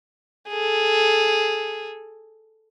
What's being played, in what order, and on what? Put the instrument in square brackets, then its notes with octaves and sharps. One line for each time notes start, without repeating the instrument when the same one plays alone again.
[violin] G#4 A4